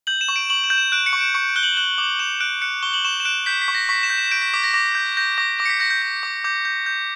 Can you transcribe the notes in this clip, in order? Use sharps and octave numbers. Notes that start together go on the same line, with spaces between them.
G6 F#7
E7
C#6
D7
C#6 F#7
E7
G6
E7
F#6 D7
C#7
C#6
D7
C#6 C#7
D7
F#6 G7
F#7
F#6 F#7
D6 F#7
D6 E7
F#6 D7
F#6 C#7
C#6 G7
F#7
C#6 E7
E7
F#6 D7
G6 B6
B6
C#6
A#6
C#6 B6
E7
G6
E7
G6 D7
B6
D6 B6
A#6
D6 A#6
G6
G6 A#6
D6 A#6
D6 A#6
C#7
B6
G6 A#6
G6
G6
D6
D6 G6
G6
G6